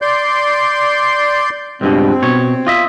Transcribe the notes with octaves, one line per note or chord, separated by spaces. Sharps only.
D5 C6 G6
C#2 G2 B2 C4
B2 C#5
F4 D#5 E5